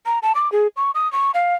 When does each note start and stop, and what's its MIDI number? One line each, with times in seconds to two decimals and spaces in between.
0.06 0.19 82
0.23 0.33 81
0.35 0.51 86
0.52 0.67 68
0.76 0.91 85
0.95 1.10 87
1.12 1.31 85
1.34 1.55 77